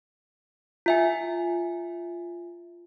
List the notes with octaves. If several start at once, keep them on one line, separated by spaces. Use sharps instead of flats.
F4 E5 G#5